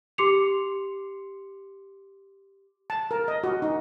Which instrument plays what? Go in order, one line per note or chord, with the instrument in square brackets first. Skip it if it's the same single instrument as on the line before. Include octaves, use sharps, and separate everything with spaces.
[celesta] G4 C6 D6 C7 C#7 F7
[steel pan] A5
A#4
D#5
F#4
D#4